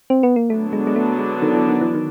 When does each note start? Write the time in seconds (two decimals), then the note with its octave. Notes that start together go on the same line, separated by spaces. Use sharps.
0.10 C4
0.23 B3
0.36 A#3
0.50 D3 F#3 A3 B3 D4
0.73 G#3
0.87 G#3
0.96 A3
1.19 G#3
1.42 D#3
1.55 E3
1.69 D#3
1.81 E3
1.95 D#3